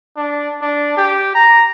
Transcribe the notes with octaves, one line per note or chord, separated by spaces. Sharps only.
D4
D4
G4
A#5